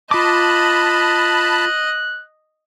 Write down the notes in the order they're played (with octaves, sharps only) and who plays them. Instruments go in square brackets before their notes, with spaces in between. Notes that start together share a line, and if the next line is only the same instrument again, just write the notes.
[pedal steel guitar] F4 D6 [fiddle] D#5 [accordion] A5 B5 [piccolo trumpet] F#6